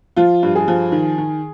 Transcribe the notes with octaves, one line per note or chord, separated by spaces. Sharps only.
F3 F4
G2
G#4
F3
D#3
D#3